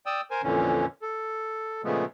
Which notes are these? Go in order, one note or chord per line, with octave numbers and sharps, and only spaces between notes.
D5 G5 D#6 E6
A#4 C5 G#5
F2 A#2 D3 E3 C#4
A4
A#2 C#3 F3 G#3 A3 B3